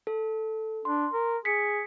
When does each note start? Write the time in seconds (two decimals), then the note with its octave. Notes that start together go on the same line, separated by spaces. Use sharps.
0.07 A4
0.85 D4 C6
1.13 A#4
1.45 G#4 B6 C#7